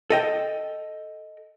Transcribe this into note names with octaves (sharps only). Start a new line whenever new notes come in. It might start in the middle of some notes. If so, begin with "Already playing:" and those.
A4 D#5 G5